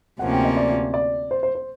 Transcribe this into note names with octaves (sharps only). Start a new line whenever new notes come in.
D2 C3 F3 A#3 C#4 F#5
G5
D#5
D5
D5
C5
C5
C5